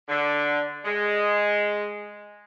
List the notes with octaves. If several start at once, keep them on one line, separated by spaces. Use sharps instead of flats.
D3
G#3